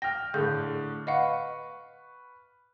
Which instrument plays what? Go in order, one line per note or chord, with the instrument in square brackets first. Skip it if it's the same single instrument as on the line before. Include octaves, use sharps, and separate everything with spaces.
[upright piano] G5 F6 [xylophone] A#6
[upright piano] A2 D3 [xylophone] G#4 G6
[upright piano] B4 C#6 [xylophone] D#5 F5 F#5